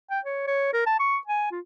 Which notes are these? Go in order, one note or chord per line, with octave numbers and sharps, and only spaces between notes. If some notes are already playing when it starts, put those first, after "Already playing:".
G5
C#5
C#5
A#4
A5
C#6
G#5
F4